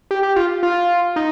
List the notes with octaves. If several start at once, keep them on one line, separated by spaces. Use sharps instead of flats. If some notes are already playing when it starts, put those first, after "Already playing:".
G4
G4
F4
F4
D#4